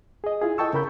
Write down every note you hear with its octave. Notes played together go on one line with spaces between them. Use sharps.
G#4 D#5
E4 F4 G#4
A4 D#5 G5 A5 C#6 E6
C#3 A#4 B5 G6